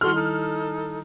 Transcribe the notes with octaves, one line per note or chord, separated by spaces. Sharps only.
D#3 G3 E4 F#4 A4 C6 F6
D#4 A4